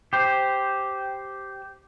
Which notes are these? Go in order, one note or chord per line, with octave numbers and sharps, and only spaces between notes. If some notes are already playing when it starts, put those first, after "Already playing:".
G4 C5